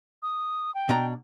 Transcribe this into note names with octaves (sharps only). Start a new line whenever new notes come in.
D#6
G5
B2 D4 A#5